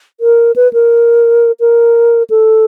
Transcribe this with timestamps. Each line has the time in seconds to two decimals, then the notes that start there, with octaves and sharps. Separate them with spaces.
0.20 A#4
0.56 B4
0.73 A#4
1.60 A#4
2.30 A4